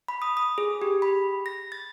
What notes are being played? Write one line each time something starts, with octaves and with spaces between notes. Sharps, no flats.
B5
D#6
D#6
G#4
G4
B5
A#6
A6